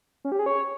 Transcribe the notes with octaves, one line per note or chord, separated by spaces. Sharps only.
C#4
G4
G#4
C#5